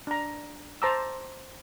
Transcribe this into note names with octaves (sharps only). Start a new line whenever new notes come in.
D4 A#5
C5 A5 A#5 D6 E6